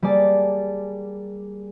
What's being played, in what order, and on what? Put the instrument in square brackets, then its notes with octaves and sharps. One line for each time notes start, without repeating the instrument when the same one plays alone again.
[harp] G3 A#3 G#4 D5 A5